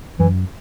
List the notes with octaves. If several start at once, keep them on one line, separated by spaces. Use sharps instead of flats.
F#2 E3